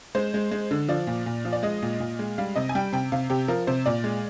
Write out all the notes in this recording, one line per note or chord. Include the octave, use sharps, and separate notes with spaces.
G#3 C5
G#3
G#3
D3
F3 D5
A#2
A#2
F3
D5
G#3 D#5
A#2
A#2
G#3
G3 F5
C3 D#5
G#5
G3 G5
C3 G5
C3 F5
C3 G4
F3 A#4
C3 C5
A#2 D5
G#3